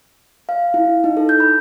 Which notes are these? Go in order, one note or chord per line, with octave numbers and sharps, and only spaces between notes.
F5
E4
D#4
A4
G6
B5